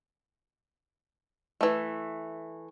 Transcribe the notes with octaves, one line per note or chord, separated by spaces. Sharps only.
E3 A3